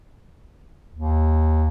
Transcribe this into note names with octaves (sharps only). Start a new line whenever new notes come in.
D#2